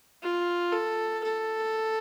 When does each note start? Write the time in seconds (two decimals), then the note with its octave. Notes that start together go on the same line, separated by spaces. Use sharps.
0.22 F4
0.72 A4
1.24 A4